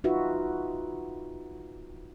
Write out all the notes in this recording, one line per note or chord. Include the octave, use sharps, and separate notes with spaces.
D#4 F4 F#4 B4 E5